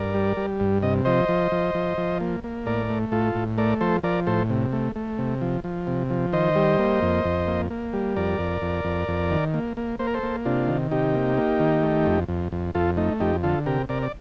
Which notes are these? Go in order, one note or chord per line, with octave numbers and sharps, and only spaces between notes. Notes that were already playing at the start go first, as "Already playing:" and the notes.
Already playing: G2 A#4 D5
G3
G3
G2
C3 D#5
F3 C5 D#5
F3
F3
F3
F3
A#3
A#3
A2 A#4 D5
A3
A2 F4 A4
A2
A3 A#4 D5
F3 A4 C5
F3 A#4 D5
A2 A4 C5
C3
A3
A3
C3
F3
F3
C3
F3
D#3 C5 D#5
G3
A#3
F2
F2
A#3
A#3
G3
F2 A#4 D5
F2
F2
F2
F2
D#3
A#3
A#3
A#3 C5
A#4
A4 C5
A#3
C3 D4 F4
D#3
C3 D#4 G4
A#3
A#3
D#3
A3
F2
F2
F2
F2 F4 A4
A3 D#4
F2 D#4 G4
D3 F4 A4
C3 G4 A#4
C3 A#4 D5
D5